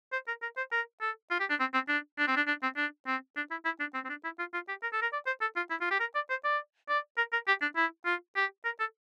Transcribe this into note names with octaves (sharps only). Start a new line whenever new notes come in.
C5
A#4
A#4
C5
A#4
A4
F4
G4
D4
C4
C4
D4
D4
C4
D4
D4
C4
D4
C4
D4
E4
E4
D4
C4
C4
D4
E4
F4
F4
G4
A#4
A4
A#4
D5
C5
A4
F4
E4
F4
G4
A#4
D5
C5
D5
D5
A#4
A#4
G4
D4
E4
F4
G4
A#4
A4